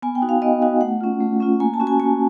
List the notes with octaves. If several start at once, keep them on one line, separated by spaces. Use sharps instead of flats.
B3 G#5
G5
D#4 F#4
F5
B3 D#5
D#4 F#4 F5
A3 F#5
C#4 F4
A3
C#4 F4
A#3 G#5
A5
C#4 F#4
G#5
A#3 G#5